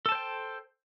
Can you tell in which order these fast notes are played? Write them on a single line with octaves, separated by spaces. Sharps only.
A4 A5 C5 G5